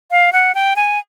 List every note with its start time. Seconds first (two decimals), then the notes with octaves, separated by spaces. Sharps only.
0.11 F5
0.33 F#5
0.55 G5
0.76 G#5